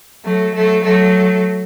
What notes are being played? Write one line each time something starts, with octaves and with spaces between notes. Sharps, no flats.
F#3 A3
F#3 A3
F#3 A3